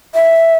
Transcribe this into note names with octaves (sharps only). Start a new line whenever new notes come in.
E5